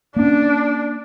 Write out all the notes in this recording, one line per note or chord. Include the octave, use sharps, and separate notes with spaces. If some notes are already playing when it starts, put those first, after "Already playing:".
A#3 C#4 D4